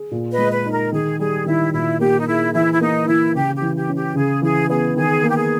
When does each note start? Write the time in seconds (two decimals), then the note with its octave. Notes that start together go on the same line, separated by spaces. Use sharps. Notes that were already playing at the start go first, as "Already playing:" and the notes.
Already playing: G#4
0.11 A#2
0.31 B4 D#5
0.38 G#3
0.51 B4
0.66 D#4
0.72 A#4
0.92 D#3 G#4
1.19 G3 G#4
1.46 D#3 E4
1.73 A#2 E4
2.00 A#3 G4
2.20 D#4
2.27 E4 G#4
2.53 E3 E4
2.72 E4
2.81 A#3 D#4
3.07 E3 E4
3.35 C#3 G4
3.55 G4
3.62 E3
3.75 G4
3.89 C#4
3.95 G4
4.15 C#3 G#4
4.42 E3 G#4
4.69 B3 G#4
4.96 D#3 G#4
5.23 A#3
5.28 G4
5.36 G#4